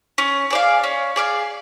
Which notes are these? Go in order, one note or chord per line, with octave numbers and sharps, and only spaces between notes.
C#4
G#4 D5 F5
C#4
G#4 D5 F5